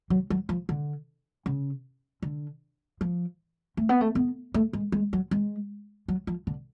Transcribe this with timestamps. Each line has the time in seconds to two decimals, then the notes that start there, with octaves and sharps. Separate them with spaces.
0.10 F#3
0.30 F#3
0.49 F3
0.69 D3
1.46 C#3
2.22 D3
3.01 F3
3.77 A3
3.89 B3
4.01 A3
4.15 B3
4.54 A3
4.73 G#3
4.92 G#3
5.13 F#3
5.31 G#3
6.08 F#3
6.27 F3
6.47 D3